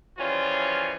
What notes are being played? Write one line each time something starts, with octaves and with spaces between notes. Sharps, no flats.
C#3 E3 F3 G3 C#4 F4